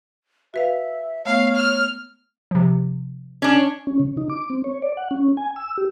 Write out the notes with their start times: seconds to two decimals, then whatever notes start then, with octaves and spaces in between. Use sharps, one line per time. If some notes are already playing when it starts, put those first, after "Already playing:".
0.54 F#4 B4 E5 F5
1.26 A3 B3 C#5 F5
1.55 F6
2.51 C3 F3
3.42 C#4 D4
3.87 C#4
3.99 C#3
4.17 D#4
4.29 D6
4.50 C4
4.64 C#5
4.82 D5
4.97 F#5
5.11 C#4
5.37 G#5
5.56 E6
5.77 G4